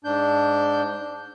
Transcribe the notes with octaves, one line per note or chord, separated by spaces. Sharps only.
G#2 D4 G6